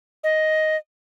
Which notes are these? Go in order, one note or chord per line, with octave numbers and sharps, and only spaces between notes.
D#5